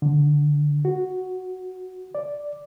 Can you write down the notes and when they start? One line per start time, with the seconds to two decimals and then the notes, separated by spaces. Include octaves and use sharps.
0.02 D3
0.85 F#4
2.15 D5